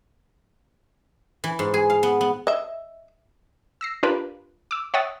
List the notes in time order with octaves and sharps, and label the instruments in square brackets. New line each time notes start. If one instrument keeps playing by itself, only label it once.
[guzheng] E3
G#2
G#4
F5
B3
B3
[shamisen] D#5 E5
[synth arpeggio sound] E6 A#6 C7
D4 F4 G4 A#4 B4
D6 E6
C#5 E5 F#5 G5 D#6 A6